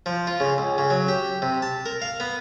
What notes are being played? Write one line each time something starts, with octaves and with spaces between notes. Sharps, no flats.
F3
F4
C#3
C#2
C#3
F#3
G4
C3
A5
A#4
F5
B3